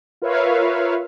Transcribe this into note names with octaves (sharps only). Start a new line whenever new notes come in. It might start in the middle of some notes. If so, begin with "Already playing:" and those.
F4 A#4 B4 C#5 E5 F5